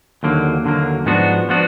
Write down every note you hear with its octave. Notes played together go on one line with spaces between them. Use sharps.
D#2 D3 F#3 A#3
D#2 D3 F#3 A#3
G#2 F3 B3 D4 F#4
F3 B3 D4 F#4